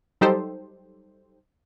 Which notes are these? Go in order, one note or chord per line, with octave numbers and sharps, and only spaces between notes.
F#3 G3 D#4 G4 A4 C5